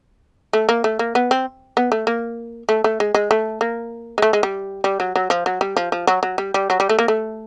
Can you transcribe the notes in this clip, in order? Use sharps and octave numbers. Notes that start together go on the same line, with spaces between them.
A3
A#3
A3
A#3
B3
C4
B3
A3
A#3
A3
A3
G#3
G#3
A3
A#3
G#3
A3
G#3
G3
G3
F#3
F#3
F3
F#3
G3
F3
F3
F#3
F#3
G3
G3
F#3
G3
A3
A#3
A3